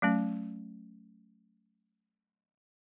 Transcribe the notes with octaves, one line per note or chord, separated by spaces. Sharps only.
F#3 A3 C#4